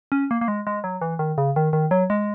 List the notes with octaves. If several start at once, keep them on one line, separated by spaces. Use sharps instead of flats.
C#4
A#3
A#3
G#3
G#3
F#3
E3
D#3
C#3
D#3
D#3
F#3
G#3